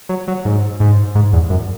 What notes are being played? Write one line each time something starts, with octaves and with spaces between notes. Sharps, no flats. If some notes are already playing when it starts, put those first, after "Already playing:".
F#3
F#3
G#2
G#2
G#2
E2
F#2